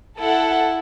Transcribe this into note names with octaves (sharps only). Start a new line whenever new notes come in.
E4 A4 F#5